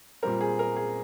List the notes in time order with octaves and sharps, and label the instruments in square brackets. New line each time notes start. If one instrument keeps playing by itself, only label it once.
[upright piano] A#2 G3 C4 A#4
G#4
A#4
G#4